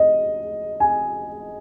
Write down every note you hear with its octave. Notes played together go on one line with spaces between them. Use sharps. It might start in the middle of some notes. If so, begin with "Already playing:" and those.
Already playing: D#5
G#5